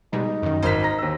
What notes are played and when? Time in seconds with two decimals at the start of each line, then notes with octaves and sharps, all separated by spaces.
0.13 B2 G3 G#3 D#4
0.43 F#2 D#3
0.63 G#1 A#4 C5 F6 B6
0.83 A#5 A#6
0.98 D#2 E6